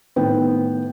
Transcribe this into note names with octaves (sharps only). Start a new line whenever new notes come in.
A2 D#3 B3 G5